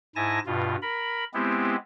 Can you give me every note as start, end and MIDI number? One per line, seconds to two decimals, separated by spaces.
0.16 0.39 44
0.16 0.39 64
0.16 0.39 80
0.16 0.39 81
0.16 0.39 94
0.46 0.76 43
0.46 0.76 47
0.46 0.76 65
0.82 1.24 70
0.82 1.24 83
1.34 1.76 56
1.34 1.76 59
1.34 1.76 60
1.34 1.76 64
1.34 1.76 67